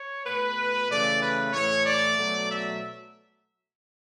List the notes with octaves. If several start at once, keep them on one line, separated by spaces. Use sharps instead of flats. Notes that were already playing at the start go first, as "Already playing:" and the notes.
Already playing: C#5
B2 A3 B4
C#3 E3 A3 D5
B4
A2 E3 A3 C#5
D5
B2 F#3 A3
E5